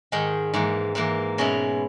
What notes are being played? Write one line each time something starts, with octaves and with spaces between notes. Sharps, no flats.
G#2 D#3 G#3
G#2 E3 A#3
G#2 E3 A#3
B2 G#3 C#4 E4